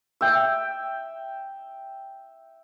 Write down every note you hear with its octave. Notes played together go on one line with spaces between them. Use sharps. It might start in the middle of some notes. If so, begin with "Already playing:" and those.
E5 G5